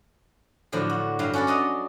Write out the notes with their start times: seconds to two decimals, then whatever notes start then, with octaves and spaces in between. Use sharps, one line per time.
0.72 A2 D3 F3 F#3
0.90 F#4
1.19 G2 F#3 F5
1.33 C#4 F#4 A4 B4 D5
1.47 D4 D#5 F#5 A#5